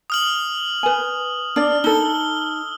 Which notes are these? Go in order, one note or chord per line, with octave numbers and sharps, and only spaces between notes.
D#6 F6 F#7
B4 G#5
D4 D5 F6
D#4 A4 E6 G7